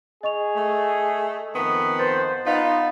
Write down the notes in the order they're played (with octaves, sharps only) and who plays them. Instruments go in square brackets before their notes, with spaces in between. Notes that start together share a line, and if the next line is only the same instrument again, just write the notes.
[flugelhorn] G#4 [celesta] D#5 C#6 F7
[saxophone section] A3
F2 D#3 B3
[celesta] B4 G6 A6 [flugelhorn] C5
[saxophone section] B3 D#4 [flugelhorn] F4 [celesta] F5 A6